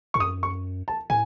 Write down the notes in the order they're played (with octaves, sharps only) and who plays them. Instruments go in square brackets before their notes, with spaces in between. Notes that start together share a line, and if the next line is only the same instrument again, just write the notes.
[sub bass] G#2 [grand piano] C#6
[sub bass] F#2 [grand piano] D#6
[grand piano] C#6
A5
[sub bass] A2 [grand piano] G#5